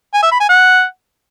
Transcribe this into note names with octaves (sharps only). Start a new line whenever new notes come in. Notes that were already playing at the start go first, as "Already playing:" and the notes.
G#5
E5
B5
G#5
F#5